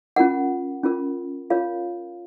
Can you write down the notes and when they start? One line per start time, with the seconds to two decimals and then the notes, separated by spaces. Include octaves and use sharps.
0.16 C#4 F4 A#4 F#5
0.84 C#4 F4 A#4
1.50 F4 A#4 C#5 F5